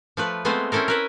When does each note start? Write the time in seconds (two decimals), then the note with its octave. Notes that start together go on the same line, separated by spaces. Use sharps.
0.17 F3 A3 B4
0.45 G#3 A3 B3 C4 F4 C5
0.72 C4 C#4 E4 A4 A#4
0.88 A#4 B4 E5